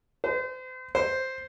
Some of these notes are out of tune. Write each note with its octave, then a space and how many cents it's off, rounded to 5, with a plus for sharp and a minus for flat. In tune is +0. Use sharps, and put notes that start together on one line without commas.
C5 -35
C5 +0